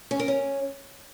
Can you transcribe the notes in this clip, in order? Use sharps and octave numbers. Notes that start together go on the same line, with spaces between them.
C#4
A#4
C#4